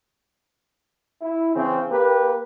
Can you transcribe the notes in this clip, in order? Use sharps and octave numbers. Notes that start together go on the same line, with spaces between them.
E4
C#3 E3 C4
A#3 G4 B4